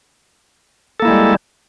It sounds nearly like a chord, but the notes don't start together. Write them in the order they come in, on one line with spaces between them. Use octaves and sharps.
A4 A#3 E4 G#3 G3